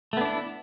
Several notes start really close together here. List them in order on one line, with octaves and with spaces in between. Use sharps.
A3 B3 D4 E4